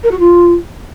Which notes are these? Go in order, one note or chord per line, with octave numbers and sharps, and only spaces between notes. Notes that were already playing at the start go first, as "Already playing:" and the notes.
A#4
F#4
F4